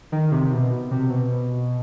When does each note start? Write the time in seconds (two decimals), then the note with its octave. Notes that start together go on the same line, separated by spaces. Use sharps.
0.12 D#3
0.32 C3
0.52 B2
0.91 C3
1.10 B2